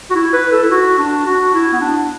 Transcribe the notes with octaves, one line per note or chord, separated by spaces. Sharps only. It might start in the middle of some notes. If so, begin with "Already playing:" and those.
F#4
E4
B4
A4
E4
F#4
D4
F#4
E4
B3
D4